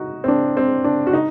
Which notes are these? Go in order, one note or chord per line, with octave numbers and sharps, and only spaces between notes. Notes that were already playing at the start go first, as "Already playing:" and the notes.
Already playing: D#4 F#4
C4
D4
C4
D4
F#4
D#4